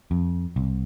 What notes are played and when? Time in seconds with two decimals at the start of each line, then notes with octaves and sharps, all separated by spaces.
0.11 F2
0.56 C2